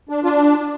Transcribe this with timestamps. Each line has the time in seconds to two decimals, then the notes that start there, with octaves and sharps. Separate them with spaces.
0.09 D4
0.24 D4 F4